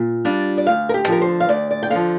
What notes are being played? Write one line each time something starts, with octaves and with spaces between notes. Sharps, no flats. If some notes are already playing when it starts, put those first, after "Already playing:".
Already playing: A#2
G3 D4 F4
D5
D2 F5
A#4
G4
D3 F3 A#4
C5
F5
D2 D5
D5
G5
D3 F3 F5